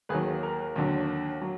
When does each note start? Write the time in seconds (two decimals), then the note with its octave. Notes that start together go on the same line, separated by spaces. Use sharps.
0.09 D#2 D#3 F#3 G#4 B4
0.43 A#4
0.76 D#2 D3 F#3
1.41 F#3